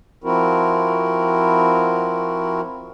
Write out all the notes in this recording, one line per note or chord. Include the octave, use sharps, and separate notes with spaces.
F3 C4 E4 F#4 A#4